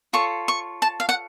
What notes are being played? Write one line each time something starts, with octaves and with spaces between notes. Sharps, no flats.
F4 A4 C#5 C#6
C#6
A5
F5
F#5